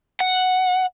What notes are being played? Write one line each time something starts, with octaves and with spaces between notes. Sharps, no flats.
F#5